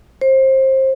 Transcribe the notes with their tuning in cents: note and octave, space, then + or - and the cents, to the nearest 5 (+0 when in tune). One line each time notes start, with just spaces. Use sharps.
C5 +25